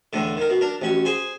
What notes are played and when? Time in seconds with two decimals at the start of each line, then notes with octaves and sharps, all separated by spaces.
0.13 E2 A2 D3
0.37 D#3 A#4
0.50 B2
0.61 D4 A#4
0.82 A1 C#4 F#4
1.05 G#4 C5 G#5